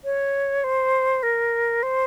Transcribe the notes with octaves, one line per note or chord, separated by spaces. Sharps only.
C#5
C5
A#4
C5